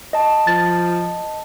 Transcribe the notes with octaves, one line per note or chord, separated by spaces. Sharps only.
D#5 A5
F3 A6